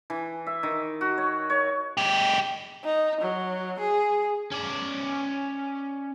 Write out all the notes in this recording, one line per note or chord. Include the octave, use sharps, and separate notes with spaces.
E3
E5
D#3
F#4
C#5
C#5
G#3 G4
D#4
F#3
G#4
C#4 D5